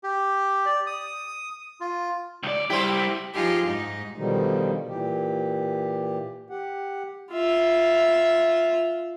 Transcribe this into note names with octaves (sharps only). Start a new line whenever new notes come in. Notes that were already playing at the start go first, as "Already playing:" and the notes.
G4
D5
D#6
F4
C#2 D5
G3 E4 G4 C5
F3 D#4 F4 G4 G#4
G#2 D#4
B2 D3 D#3 F3 G3 D#4
A#2 E3 G4
G4 F#5
F4 E5